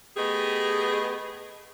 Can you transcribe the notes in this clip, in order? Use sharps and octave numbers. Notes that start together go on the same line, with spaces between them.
A3 B3 G4 G#4 D#5